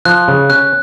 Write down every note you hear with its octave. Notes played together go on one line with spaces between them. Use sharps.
F3 F#6
C#3
C#4 F#6